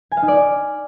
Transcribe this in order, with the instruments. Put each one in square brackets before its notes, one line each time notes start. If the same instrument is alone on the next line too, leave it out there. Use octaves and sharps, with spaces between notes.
[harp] G#5
F5
D#4
D5